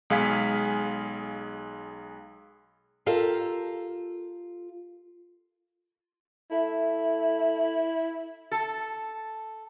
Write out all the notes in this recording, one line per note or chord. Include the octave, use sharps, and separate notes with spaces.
B1 G#3 G#4 F5 G#5 B6
F4 G4 A4 A#4 F5
A3 E4
A4